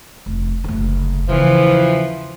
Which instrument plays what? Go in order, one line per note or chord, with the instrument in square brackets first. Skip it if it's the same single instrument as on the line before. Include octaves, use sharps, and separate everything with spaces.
[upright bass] F1
F#1 D2
[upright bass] E2 C#3 [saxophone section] E3 F3